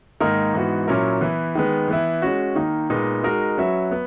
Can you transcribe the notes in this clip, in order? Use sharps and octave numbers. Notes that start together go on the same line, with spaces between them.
G#2 D#3 A#3 D#4 A#4
G#2 E3 B3 F#4
A#2 F#3 C#4 E4 A#4
E3 B3 E4
D#3 G#3 B3
E3 B3 E4
G#3 C#4 F#4
D#3 A#3 D#4
A#2 G#3 B3 D#4
G#3 D#4 F#4 A#4
F#3 C#4 F#4 B4 E5
B3